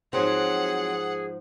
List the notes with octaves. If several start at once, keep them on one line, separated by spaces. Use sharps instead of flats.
G#2 F3 F#3 C4 G#4 F#5